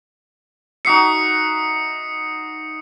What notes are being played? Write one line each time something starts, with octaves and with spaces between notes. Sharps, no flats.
D#4 F#4 E5 D#6 C7 C#7